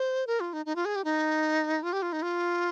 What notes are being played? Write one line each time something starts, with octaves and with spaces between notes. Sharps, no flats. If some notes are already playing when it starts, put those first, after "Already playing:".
Already playing: C5
A#4
F4
D#4
D#4
F4
G#4
G4
D#4
F4
G4
F4
D#4
F4